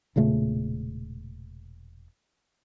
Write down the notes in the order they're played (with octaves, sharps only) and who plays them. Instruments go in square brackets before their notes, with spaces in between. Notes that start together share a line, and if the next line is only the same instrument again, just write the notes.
[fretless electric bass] E1 A#2 C#3 A3